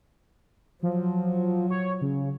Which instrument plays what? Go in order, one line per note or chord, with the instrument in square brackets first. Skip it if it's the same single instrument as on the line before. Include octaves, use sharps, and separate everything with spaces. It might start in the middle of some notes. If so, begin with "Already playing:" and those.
[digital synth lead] F3 [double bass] F#3
[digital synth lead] C#5
C#3